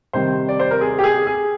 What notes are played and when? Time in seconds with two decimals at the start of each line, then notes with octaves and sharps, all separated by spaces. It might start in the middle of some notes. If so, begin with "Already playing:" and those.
0.13 C3 D#3 G3 C5
0.49 D5
0.60 C5
0.71 A#4
0.81 G#4
0.99 G4
1.04 G#4
1.27 G#4